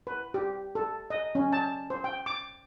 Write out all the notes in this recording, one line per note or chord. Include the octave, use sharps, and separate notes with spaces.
B4
G4
A4
D#5
C#4
A5
C5
G5
D6